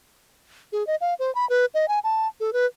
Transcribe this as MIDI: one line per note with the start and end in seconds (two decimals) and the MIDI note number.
0.72 0.86 68
0.87 0.96 75
1.01 1.14 77
1.19 1.33 72
1.35 1.48 83
1.50 1.66 71
1.74 1.88 75
1.88 1.99 80
2.04 2.28 81
2.40 2.53 69
2.53 2.66 71